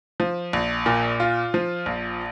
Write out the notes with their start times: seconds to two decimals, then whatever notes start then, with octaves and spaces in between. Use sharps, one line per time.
0.20 F3
0.53 A#1
0.86 A#2
1.20 F4
1.54 F3
1.86 A#1